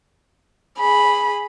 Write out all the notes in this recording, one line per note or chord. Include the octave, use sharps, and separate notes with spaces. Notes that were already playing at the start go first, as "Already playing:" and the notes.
G#4 B5